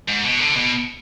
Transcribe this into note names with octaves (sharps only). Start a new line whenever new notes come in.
G#2
B2
D3
B2